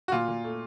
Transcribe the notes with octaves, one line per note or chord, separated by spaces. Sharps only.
F#4
A#2 F4
A#2
A3